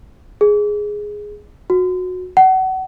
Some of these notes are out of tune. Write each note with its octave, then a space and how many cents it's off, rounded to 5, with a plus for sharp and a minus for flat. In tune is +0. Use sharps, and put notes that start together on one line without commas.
G#4 +0
F#4 -20
F#5 +30